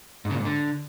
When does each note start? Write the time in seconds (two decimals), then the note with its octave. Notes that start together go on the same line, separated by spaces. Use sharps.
0.25 G#2
0.30 C#3
0.35 A#2
0.40 G#2
0.45 D3